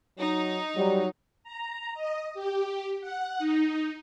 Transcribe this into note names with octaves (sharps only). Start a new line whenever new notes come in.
F#3 D#4
F#3 G3
A#5
D#5
G4
F#5
D#4